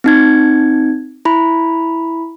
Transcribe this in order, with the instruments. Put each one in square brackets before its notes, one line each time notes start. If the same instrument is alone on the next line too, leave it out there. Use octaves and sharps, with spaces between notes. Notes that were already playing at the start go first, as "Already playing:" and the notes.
[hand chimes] C4 D#4 G#6
E4 B5